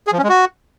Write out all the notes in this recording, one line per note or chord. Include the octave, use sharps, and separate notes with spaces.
G#4
F3
C#4
G#3
F#4